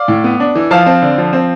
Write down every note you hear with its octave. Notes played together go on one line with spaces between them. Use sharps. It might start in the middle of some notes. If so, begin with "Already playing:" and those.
Already playing: D5 F5
A2
B3
D4
E3
F3 F5 A5
C4
D3
F3
C4